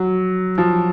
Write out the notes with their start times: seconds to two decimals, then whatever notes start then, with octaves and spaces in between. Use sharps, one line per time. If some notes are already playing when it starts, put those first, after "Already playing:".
Already playing: F#3
0.58 F3